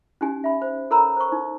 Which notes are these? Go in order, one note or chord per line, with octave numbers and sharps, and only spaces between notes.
C#4 D#4 G4 G#5
E5 B5
C5
A4 A#4 C#5 A#5 B5 E6
C5 C#6
D#4 C5